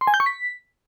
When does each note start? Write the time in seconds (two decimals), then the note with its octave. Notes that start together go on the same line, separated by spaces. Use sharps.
0.01 C6
0.07 G#5
0.14 G6
0.20 C#6
0.26 B6